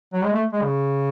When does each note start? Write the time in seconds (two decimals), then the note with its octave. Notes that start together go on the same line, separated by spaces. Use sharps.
0.13 F#3
0.24 G#3
0.33 A3
0.53 G#3
0.62 C#3